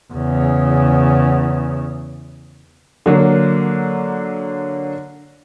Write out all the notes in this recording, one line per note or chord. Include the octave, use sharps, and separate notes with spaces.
E2 C#3
D3 F#3 A#3